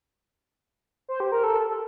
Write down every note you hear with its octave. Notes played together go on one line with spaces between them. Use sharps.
C5
G4
A#4
A4